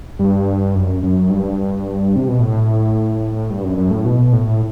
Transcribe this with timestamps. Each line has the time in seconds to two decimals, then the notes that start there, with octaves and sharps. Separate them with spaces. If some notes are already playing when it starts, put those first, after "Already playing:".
0.19 G2
0.75 F#2
1.03 F#2
1.29 G2
2.16 C3
2.28 B2
2.40 A2
3.50 G2
3.64 F#2
3.78 F#2
3.91 A2
4.05 B2
4.33 A2